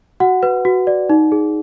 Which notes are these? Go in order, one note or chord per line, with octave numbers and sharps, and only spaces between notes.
F#4 F#5
B4
F#4
D5
D#4
G#4